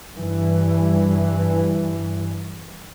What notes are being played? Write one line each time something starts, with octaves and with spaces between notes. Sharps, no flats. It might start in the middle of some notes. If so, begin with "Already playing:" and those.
G2 E3